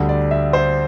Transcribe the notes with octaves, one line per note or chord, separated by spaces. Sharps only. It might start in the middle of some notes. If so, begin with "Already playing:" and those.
Already playing: D2 D3 G3
D5
E5
C5